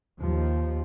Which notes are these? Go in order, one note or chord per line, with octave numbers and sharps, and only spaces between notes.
D#2 F3